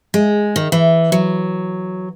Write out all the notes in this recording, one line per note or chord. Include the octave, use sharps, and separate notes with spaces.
G#3
D#3
E3
F#3